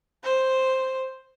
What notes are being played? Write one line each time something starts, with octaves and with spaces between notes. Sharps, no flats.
C5